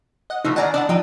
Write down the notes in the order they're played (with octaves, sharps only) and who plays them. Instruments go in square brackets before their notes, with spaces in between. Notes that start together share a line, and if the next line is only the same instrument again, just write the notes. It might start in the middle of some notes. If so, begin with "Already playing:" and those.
[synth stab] D#5 F#5
[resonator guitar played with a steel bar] E3 F3 A3 [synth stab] D#4
[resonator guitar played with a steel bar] D#3 D5 D#5 [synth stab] F#5 G#5 A#5
[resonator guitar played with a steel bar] E3 D4 [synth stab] D5 D#5 F#5
[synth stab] F3 [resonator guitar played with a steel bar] D#4 D#5 G5